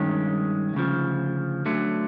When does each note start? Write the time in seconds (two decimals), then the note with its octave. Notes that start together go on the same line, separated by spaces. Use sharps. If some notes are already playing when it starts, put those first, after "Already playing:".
Already playing: G2 D#3 G#3 C#4
0.74 D2 C#3 F3
1.65 D2 D3 F#3 A3